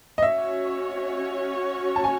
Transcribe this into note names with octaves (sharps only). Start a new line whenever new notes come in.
D#5
C#4 F#4 C#5 E5
A5
G#5